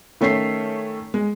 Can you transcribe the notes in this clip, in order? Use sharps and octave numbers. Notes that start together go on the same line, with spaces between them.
D#3 A3 C#4 C#5 B6 C7
G#3